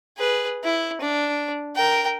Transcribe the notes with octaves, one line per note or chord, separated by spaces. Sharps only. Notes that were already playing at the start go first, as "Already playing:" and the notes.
G#4 B4
E4
D4
A#4 G5